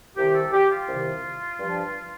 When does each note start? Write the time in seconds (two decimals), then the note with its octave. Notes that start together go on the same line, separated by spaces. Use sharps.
0.17 C2 C3 D#3 G4
0.34 A4
0.52 G4
0.69 F4
0.87 C2 C3 D#3
1.59 G2 F3